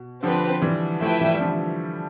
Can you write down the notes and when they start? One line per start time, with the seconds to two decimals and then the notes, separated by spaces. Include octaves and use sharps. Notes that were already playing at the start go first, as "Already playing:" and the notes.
Already playing: B2
0.23 D3 F3 C4 G4 B4
0.61 E3 G3
1.01 F3 A3 E4 B4 E5 G5
1.21 E3 G3
1.34 G3
1.40 D3 F3